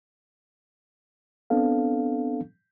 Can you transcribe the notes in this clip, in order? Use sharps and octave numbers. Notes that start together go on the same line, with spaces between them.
B3 C4 D4 A4 F5